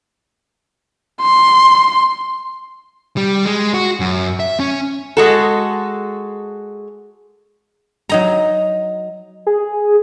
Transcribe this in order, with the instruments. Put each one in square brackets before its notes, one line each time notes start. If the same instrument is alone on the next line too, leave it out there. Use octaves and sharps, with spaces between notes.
[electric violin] C6
[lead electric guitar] G3
G#3
F#4
F#2
E5
C#4
[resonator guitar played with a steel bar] G#3 F#4 A4
[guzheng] F#3 D#4 A#5
[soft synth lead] G#4